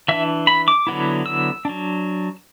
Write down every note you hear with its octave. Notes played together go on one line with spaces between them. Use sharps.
E3 D4 E5
B5
D6
D3 F#3 B3 E4
E6
F#3 D4